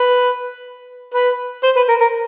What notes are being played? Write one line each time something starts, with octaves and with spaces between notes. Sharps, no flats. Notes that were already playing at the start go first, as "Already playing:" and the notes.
Already playing: B4
B4
C5
B4
A#4
A#4